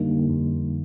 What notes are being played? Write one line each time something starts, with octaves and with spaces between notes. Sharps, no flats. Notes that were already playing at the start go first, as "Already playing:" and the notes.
Already playing: F2 D3 G3 A#3 D#4
F2